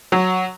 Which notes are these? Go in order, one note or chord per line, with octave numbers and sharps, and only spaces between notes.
F#3